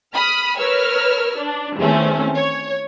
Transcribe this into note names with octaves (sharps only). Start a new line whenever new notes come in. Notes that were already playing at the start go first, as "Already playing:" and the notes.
B5 D#6 F6
A#4 B4 C#5 E6 F6
D4
E2 D#3 A3 C4 C#4
C#5